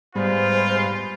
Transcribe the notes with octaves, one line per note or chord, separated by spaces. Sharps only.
G#2 G3 B3 F4 C5